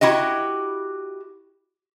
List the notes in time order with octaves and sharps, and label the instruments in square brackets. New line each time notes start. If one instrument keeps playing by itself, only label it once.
[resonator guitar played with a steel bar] E4 F#4 G4 D#5